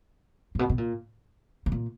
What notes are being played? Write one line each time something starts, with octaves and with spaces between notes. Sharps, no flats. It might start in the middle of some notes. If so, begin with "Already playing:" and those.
A#2
B2
B2
A#2
B2
A#2